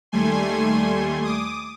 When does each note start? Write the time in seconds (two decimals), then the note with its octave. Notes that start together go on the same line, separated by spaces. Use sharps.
0.12 D#2 G3 A3 G#5 C6
1.24 D6 D#6